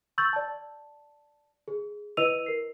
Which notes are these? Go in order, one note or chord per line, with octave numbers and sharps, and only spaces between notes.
C#6 E6 G6 A6 F#7
D5 A5
G#4
E4 B4 D#5 E6 D#7 F7
A#4 C7